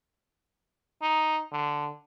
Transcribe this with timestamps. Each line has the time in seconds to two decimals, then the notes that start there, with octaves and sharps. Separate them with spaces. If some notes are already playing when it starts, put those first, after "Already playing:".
1.02 D#4
1.52 D3